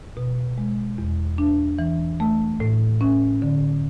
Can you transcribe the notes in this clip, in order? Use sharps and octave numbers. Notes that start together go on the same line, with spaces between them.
B2
G#3
E2
D4
E3
A3
A2
C#4
D3